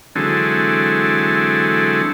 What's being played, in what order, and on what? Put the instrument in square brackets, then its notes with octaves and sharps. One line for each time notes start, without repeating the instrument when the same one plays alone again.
[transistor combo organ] D3 E3 F#3 G#3 C4 A4